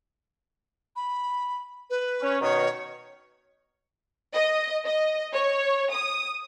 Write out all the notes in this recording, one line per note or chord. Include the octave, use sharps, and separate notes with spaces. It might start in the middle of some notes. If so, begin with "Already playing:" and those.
B5
B4
C#4
B2 D#3 C#5
D#5
D#5
C#5
D#6